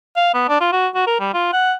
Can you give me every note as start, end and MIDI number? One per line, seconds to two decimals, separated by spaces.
0.16 0.34 77
0.34 0.46 59
0.48 0.60 62
0.60 0.70 65
0.72 0.88 66
0.95 1.05 66
1.07 1.19 70
1.20 1.31 55
1.34 1.52 65
1.53 1.74 78